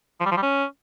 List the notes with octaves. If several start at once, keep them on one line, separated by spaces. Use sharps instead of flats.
F3
G3
F3
G3
C#4